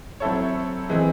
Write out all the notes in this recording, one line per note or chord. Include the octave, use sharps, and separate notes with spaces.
F#3 C4 E4 A4 C#5
E3 G#3 C4